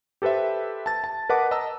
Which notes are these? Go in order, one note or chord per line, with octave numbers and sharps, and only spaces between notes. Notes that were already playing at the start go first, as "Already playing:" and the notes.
G4 A4 B4 C5 E5
A5 A6
A5
A#4 B4 D#5 F#5 A5 D6
D#5 A5 A#5 E6